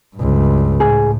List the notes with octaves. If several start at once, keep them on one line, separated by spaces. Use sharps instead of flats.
C#2 G2
A2 G#4